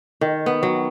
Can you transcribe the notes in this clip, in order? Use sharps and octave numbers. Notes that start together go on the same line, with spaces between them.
D#3
B3
F#3